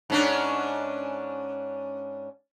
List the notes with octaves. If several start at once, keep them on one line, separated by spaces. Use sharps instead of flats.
G#2 C#4 D4